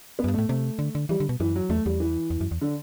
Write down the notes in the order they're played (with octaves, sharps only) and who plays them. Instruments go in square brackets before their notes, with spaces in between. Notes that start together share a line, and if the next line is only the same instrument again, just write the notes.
[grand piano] B3
[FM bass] F#2
G2
[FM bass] A2 [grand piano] A3
[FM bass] C3 [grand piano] A3
[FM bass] D3
D3
[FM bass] E3 [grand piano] G3
[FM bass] D3
B2
[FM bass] F#2 [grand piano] E3
[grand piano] F#3
[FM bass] E2 [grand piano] A3
[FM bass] E2 [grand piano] G3
[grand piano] E3
[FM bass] E2
F#2
E2
[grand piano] D3